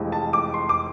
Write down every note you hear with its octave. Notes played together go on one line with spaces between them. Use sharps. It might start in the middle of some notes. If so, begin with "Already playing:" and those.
Already playing: F1 F2 E3 G#3
A5
D6
C6
D6